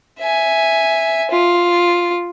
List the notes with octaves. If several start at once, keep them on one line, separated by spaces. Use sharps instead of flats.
E5 G#5
F4